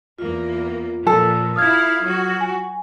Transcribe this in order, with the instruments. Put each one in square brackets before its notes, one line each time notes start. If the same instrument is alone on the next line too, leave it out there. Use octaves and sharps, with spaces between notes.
[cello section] E2 A#3 [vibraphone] F4
[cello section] A#2 F3 [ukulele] A4
[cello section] E4 F5 [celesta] D#6 F6 G#6
[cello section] F#3 F#4
[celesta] G#5